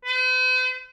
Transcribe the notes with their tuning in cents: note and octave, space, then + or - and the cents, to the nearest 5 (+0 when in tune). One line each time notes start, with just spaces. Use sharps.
C5 -45